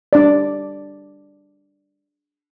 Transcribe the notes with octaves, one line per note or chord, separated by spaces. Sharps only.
D4 D5